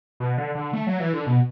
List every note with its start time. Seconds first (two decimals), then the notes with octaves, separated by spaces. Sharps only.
0.20 B2
0.38 D3
0.55 D3
0.73 A3
0.87 F#3
1.00 E3
1.13 D3
1.26 B2